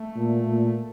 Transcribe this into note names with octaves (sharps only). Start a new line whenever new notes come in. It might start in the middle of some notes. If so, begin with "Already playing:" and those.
Already playing: A3
A#2
A#2